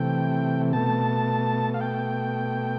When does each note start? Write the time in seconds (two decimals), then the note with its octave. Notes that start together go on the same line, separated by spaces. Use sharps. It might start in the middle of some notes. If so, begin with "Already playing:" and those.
Already playing: C3 E3 A3 G5
0.73 B2 A3 A5
1.74 F5
1.81 G5